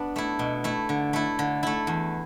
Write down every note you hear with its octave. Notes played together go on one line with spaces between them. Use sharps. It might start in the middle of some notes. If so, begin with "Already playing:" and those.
Already playing: B3 D4
A3 E4
B2
A3 E4
D3
A3 E4
D3
A3 E4
E2